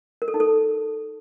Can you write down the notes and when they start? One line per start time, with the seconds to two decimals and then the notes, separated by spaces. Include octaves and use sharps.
0.22 A#4
0.28 A4
0.34 D#4
0.40 A4